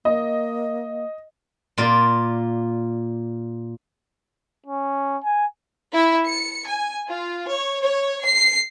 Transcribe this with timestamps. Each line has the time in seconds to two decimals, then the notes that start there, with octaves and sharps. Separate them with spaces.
0.05 A#3 D#5
1.78 A#2 F4 D5
4.66 C#4
5.23 G#5
5.94 E4
6.27 C#7
6.68 G#5
7.08 F4
7.50 C#5
7.82 C#5
8.25 C7